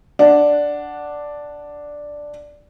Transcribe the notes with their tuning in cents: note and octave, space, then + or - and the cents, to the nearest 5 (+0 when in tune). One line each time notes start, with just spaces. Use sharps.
D4 +0 F#5 +0